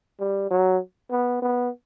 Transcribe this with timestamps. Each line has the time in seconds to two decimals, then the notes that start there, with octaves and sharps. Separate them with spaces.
0.19 G3
0.50 F#3
1.11 B3
1.42 B3